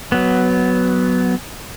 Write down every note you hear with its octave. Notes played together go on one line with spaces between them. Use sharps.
F#3 B3